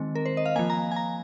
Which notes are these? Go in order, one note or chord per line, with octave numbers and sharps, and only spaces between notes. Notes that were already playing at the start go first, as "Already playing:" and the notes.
Already playing: D#3 G#3 C4
A#4
C5
D#5
F5
F3 A#3 G#5
A#5
G#5
A#5